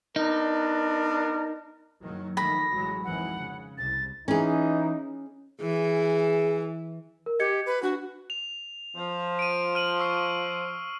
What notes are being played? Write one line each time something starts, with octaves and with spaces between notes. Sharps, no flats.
B3 D4 D#4 A#4
F#1 D#3 F#3
D#3 F3 A3 B5 A#6
A1 F#3 G#3
G#1 F2 E3 F#5
C#3
C2 A6
E3 C#4 D#4 G#4
E3 G#4
A#4
G4 D#5 G#6 C#7
B4
D4 F#4
F7
F3
D7 D#7
F6 D#7 F#7
C#6 E6 C7